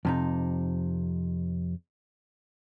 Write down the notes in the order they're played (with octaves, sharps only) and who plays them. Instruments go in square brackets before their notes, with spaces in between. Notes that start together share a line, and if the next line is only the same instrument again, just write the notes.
[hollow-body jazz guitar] F2 C3 D#4